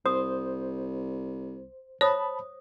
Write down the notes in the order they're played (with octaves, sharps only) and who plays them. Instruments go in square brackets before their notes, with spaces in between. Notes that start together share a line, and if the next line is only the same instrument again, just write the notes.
[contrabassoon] C2 [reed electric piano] C5 [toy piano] D#6
[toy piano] C5 D#6 [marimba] C#5 [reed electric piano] A5 B5